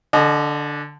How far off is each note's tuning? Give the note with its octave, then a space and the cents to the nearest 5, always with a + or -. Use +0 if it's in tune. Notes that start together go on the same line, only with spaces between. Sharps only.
D3 +0 D#5 -35 G#5 +45